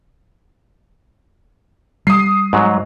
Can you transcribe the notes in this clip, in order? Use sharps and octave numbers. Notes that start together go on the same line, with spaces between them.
G3 D#6 C7
G#2 F#3